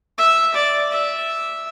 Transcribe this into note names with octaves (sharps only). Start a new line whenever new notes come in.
E5
D5
E5